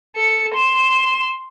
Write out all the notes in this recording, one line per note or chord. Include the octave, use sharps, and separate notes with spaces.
A4 C#7
C6 E7